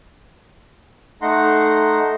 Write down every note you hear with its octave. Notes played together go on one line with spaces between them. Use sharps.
A3 D#4 F#5 A#5 C6